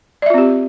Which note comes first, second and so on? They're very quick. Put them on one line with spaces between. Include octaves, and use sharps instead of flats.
D5 E5 F4 C4 G4